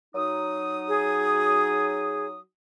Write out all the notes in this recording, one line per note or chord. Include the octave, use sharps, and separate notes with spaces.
F#3 D#4 D#6
G#4